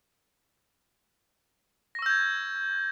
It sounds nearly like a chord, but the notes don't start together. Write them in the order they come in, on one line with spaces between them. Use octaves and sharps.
A#6 C#6 E6 G6 G#6